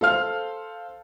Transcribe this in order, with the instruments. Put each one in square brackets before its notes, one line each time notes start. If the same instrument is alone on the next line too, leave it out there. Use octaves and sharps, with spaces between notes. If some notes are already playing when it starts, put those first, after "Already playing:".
[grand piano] A4 C5 F5 F6